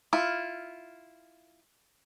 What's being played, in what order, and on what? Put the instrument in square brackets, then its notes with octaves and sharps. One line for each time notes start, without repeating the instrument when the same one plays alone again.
[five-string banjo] E4 F4